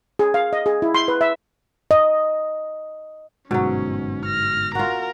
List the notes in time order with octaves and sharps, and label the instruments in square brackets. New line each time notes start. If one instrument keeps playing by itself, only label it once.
[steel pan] G#4
F5
D#5
G#4
E4
C6
B4
E5
[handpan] D#5
[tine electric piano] G1 G#2 [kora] B2 F#3 [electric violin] C#4
[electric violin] F6 A#6
[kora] F4 F#4 [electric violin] A#4 A#5